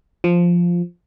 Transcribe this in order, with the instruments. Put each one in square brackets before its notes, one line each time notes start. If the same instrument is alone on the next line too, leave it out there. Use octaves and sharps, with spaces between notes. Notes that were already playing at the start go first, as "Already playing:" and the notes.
[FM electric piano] F3